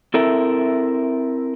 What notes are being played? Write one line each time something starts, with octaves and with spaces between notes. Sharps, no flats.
C4 E4 A4 A#4 E5